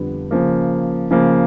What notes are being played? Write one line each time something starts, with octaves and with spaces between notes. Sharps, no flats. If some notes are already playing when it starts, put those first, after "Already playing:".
Already playing: F2 D3 G3 B3 D4
C#3 F3 A#3
C#3 F3 A#3